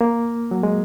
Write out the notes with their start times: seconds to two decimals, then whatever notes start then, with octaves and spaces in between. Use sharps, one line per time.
0.01 A#3
0.51 F#3
0.63 G#3